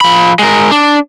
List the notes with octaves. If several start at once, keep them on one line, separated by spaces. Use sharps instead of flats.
F3 B5
G#3 A#4
D4